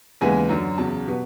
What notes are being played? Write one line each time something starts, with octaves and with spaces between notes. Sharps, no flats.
D#2 C#3 E3 G#3 B3 G#5
F#2 D3 F#3
E2 C#3 F#3 A5
B2 G3 B3